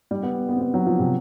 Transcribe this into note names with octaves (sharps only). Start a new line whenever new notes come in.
G3
B3
B3
C4
B3
F#3
F3
C3